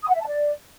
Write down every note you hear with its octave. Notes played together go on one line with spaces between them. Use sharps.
D#6
F#5
E5
A5
D5